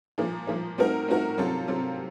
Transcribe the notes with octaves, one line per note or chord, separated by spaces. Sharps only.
A#2 F3 A#3
A#2 F3 A#3
A3 C4 D#4 F#4 A#4
A3 C4 D#4 F#4 A#4
C3 F#3 C4 F4 A4
C3 F#3 C4 F4 A4